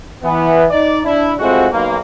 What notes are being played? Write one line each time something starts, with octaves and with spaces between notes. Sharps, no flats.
E3 B3
D#4 D5
D4 E4
A2 G#3 C4 F4 F#4
B1 A#3